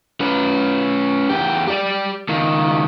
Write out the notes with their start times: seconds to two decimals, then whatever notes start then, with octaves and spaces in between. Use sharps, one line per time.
0.21 C#4 B4
1.30 E2 G4
1.67 G4 D5
2.29 C#2 D#3